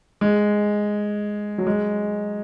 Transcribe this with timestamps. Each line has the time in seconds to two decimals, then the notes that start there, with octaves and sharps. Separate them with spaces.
0.21 G#3
1.58 F#3
1.67 G#3